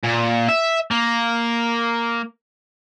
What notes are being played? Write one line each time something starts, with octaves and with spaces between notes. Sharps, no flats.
A#2
E5
A#3